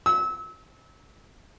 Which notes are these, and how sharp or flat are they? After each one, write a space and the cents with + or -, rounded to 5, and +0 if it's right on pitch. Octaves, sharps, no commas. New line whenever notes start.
E6 -30